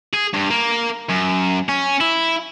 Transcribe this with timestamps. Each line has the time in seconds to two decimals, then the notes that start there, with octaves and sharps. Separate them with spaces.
0.14 G#4
0.34 G2
0.50 A#3
1.09 F#2
1.69 C#4
2.01 E4